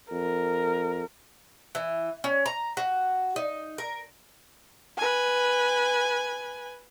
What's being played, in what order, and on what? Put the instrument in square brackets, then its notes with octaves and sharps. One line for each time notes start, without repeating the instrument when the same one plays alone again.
[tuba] F2 [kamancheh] A#4
[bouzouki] E3
C#4
A#5
F#4
D#4
A#4
[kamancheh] B4 G#5